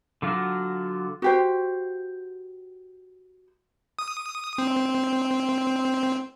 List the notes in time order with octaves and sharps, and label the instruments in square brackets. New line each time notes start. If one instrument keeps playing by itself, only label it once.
[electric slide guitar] D3 F#3 F4 F#4
[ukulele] F#4 G4 C5
[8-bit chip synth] D#6
C4